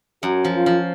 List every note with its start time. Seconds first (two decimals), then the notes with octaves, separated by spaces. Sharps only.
0.23 F#2 F#4
0.45 F3
0.55 F4
0.66 F3